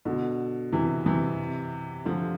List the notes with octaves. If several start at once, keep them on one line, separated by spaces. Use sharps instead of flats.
B2 D3
C3 E3
C3 E3
D3 F3